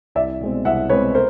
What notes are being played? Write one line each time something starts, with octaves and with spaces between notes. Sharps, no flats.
C2 D5 E5
B2 G#3 C4
C2 E5 F#5
B2 G#3 C4 B4 C#5
A#4 C5